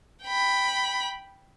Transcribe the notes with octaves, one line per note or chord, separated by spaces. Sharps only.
G5 B5